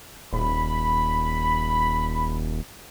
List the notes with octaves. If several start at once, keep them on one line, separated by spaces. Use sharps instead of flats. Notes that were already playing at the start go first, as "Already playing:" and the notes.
D#1 B5